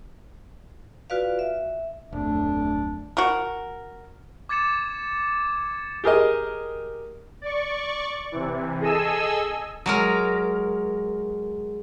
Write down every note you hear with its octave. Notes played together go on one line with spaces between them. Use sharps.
F4 F#4 B4 D5 F5
E5
D1 F2 A3 D4
F#4 A#4
D6 G#6 A6 C#7 E7
G4 G#4 A#4 D#5
D5 C#6
C3 E3
G#4 A4 D#5 G#5 E6
F#3 G#3 A#4